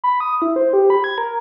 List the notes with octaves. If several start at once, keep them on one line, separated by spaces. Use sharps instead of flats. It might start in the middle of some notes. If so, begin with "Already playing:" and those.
B5
D#6
E4
C5
G4
B5
G#6
A#4